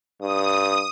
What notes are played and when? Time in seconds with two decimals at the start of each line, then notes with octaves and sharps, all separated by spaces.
0.21 G2 D#6